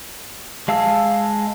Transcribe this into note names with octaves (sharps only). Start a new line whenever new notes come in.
G#3 F5 A5 E6